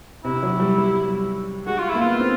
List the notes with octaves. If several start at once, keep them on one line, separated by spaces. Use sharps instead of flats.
C3 E4
F#3
G3
G3
G#3 F#4
F4
E4
A#3
B3 F4
C4